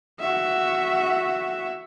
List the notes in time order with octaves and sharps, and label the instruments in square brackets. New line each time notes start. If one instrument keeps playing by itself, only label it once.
[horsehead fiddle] F#4 E5